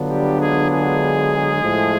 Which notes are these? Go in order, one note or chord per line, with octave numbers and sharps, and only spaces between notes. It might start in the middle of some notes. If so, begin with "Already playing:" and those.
Already playing: D3 F#3 B3 D4 F4
G3 G4
G#3 G#4
G#3 G#4
A2 F3 A3